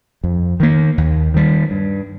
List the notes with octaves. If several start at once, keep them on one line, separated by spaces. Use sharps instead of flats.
F2
D#3 A#3
D#2
D#3 G3
G2